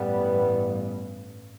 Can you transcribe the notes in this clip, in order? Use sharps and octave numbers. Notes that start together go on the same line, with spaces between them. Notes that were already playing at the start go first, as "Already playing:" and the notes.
Already playing: A1 G2 G3 B3